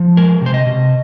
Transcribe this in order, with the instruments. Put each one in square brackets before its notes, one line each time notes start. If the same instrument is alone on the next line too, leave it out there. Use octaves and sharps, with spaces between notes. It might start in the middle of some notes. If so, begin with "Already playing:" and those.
Already playing: [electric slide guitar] F3
G#3 A#4
C3 C5
D#5
C3